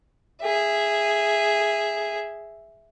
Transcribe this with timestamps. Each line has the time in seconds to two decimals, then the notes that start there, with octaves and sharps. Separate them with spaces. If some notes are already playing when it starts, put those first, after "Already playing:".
0.42 G#4 E5